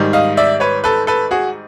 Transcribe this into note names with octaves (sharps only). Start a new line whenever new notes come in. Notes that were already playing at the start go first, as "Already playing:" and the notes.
Already playing: G#2 D#3 G3
D#5 F5
D5 E5
B4 C#5
A4 B4
A4 B4
F#4 G#4